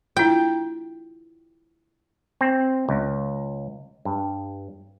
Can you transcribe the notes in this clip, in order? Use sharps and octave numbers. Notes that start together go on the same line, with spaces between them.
E4 F4 G5
C4
C#2
G2